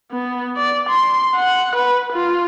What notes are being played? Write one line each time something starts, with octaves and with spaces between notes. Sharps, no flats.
B3
D5
C6
F#5
B4
F4